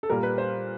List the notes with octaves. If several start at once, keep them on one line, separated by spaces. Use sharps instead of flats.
A4
A#2 G3 A#4
B4
C5